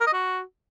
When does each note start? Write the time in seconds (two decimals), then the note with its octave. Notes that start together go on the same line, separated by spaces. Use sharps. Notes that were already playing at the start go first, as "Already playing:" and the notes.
0.01 A#4
0.07 D#5
0.13 F#4